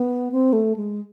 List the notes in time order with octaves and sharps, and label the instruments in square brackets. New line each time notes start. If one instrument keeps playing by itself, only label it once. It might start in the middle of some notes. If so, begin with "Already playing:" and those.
Already playing: [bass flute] B3
C4
A3
G#3